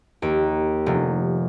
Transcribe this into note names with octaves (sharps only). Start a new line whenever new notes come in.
D#2
F1